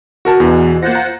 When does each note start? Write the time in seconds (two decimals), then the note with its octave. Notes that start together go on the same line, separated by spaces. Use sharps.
0.25 F#4 A#4 A5
0.40 E2 B2 E3
0.83 A#3 F4 C5 F#5 A#6
0.95 A#5